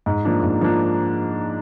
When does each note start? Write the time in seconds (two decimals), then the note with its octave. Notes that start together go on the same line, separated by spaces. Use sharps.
0.06 G#2
0.25 F3 A#3 D4
0.43 G#2
0.61 F3 A#3 D4